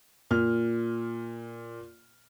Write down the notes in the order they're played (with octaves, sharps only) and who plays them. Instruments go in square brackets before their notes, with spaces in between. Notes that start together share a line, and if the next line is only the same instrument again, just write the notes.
[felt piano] A#2 F6